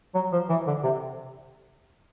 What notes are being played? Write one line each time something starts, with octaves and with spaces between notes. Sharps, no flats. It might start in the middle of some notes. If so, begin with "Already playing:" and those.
F#3
F3
E3
D3
C3